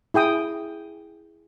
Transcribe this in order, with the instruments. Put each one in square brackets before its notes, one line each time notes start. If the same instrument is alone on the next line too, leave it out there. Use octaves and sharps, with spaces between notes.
[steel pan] E4 G#4 G5 D#6